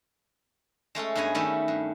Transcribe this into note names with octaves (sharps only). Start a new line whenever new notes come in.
G#3 A3 C#4 A4
G2 B3 C#4 D#5 G#5
D#3 G3 A3 C#4 D#5 E5
G2